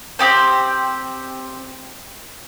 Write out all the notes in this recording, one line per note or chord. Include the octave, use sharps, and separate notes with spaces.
C4 D#4 G4 C5